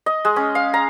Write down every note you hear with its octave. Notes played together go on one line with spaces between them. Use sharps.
D#5
G#3
C#4
F5
A#5